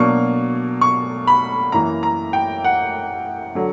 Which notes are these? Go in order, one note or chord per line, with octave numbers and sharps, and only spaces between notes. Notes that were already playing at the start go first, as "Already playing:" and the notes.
Already playing: B2 F#3 A#3 D4 C#6
C#6
B5
F#2 E3 A#3 A#5
A#5
G5
F#5
D3 F#3